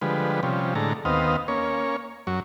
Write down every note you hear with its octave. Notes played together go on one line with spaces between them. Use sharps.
D3 F3 G3 G#3 B4
C3 F3 G3 C#4
A2 D3 G#3 A4 A#5
D#2 B3 C4 D#5 F5
A#3 C#4 C#5
F#2 F#3 C#6